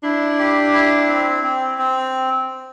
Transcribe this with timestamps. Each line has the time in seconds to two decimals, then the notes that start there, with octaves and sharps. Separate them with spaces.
0.03 D4 E4
0.39 G4
0.74 E4
1.08 C4
1.43 C4
1.78 C4